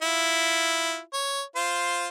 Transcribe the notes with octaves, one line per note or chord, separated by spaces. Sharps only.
E4 F4
C#5
F4 C5